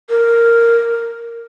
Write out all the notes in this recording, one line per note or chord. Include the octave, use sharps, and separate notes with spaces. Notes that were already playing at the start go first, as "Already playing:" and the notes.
A#4